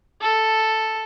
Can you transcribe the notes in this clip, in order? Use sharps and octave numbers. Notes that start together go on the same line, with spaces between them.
A4